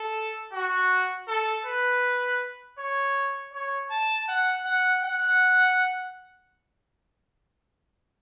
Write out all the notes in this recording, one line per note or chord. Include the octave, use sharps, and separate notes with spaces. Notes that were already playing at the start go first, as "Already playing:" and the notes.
Already playing: A4
F#4
A4
B4
C#5
C#5
A5
F#5
F#5
F#5